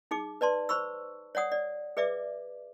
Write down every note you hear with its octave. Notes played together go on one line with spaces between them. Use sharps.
D#4 G#4 D6
B4 D5 A5 C6
C5 B5 C#6 E6
C#5 D5 F#5 D#6
D5
G#4 B4 D5 E5 D6